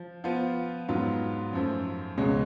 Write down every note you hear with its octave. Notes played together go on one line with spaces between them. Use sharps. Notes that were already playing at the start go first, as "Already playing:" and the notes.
Already playing: F3
F3 B3 F4
G#2 F#3 B3 F4
F#2 F3 A3
C#2 B2 G#3 C#4